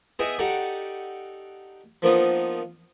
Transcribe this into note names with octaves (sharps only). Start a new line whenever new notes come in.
B3 E4 G#4 D#5 E5 G5
D#4 F#4 G4 A4 D5 F#5
F3 A#3 B3 D4 D#4